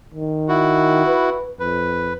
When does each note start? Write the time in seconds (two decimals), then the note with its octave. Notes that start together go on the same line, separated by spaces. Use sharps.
0.14 D#3
0.49 E4 F#4
1.07 B4
1.60 F2 B4